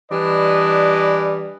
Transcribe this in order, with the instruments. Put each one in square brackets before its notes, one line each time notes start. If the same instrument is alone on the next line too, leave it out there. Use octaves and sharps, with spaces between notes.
[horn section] E3 G3 D4 B4 D#5